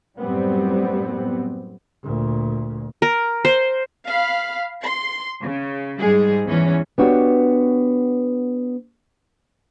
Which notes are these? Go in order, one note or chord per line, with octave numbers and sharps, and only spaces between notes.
F#2 A2 G3 B3 C4
D2 A#2
A#4
C5
F5 B5 F6
C6
C#3
G#2 G3 G#3 G#4
E2 E3 C#4
B3 D4 F#4 G4 C#5